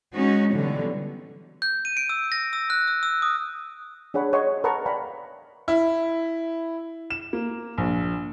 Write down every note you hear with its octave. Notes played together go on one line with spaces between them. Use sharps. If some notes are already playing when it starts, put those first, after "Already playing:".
G#3 C#4 D#4 F#4
B2 D3 E3 F#3 G3
G6
D#7
D7
E6
A#6
E6
F#6
E6
E6
D#6
D4 G#4 C#5 F#5 B5
C#5 D#5 F#5 C6 C#6
A#4 B4 F#5 A5 A#5 C#6
D5 F5 G5 A#5 B5
E4
E7
A#3
A#1